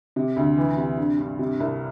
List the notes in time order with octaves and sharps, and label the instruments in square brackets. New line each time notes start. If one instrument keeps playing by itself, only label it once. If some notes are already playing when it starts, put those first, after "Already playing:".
[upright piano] C3
D2
E3
C3
D3
G2
C3
C2